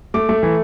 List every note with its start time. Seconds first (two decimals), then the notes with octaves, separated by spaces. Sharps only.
0.14 A3 D6
0.29 A3
0.43 E3